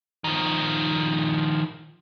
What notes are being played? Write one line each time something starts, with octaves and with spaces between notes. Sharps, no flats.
D#3 F3